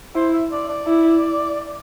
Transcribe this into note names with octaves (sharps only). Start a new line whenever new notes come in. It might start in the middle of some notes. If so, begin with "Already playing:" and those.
E4 C5
E5
D5
D5
E4